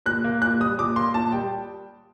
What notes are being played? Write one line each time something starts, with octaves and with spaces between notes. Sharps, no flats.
A#2 F#6
A#3
A#2 F#6
G3 D#6
A#2 D6
A#3 C6
A#2 A5
G3 G5